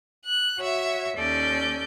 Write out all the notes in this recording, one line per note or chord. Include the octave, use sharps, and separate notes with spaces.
F#6
F#4 C#5 E5
D#2 C#4 A4 D5 G6